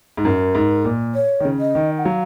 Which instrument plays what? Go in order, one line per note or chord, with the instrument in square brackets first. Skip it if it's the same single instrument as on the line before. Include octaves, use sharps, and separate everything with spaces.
[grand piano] G#2
[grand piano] F#2 [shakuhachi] A#4
[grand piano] G#2
A#2
[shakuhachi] C#5
[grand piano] D#3
C#3
[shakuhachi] D#5
[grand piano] D#3
[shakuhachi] F#5
[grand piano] F#3 [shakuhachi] F5